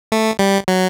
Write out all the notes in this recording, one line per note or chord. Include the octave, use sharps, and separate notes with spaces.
A3
G3
F#3